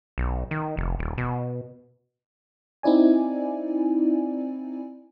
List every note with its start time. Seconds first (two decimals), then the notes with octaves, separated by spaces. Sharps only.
0.18 B1
0.51 D#3
0.77 F1
0.99 D#1
1.18 B2
2.83 C4 D#4 E4 D5 G#5